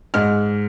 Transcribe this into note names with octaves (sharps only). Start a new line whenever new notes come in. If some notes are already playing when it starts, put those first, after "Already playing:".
G#2 F6